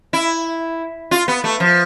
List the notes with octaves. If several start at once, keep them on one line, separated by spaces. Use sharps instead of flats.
E4
F4
B3
A3
F3